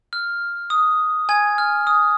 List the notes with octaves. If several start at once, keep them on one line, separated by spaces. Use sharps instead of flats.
F6
D#6
G#5 G#6
F6
D#6